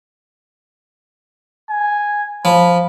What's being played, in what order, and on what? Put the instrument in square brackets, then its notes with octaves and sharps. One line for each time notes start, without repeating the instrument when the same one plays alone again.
[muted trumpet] G#5
[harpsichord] F3 [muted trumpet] B5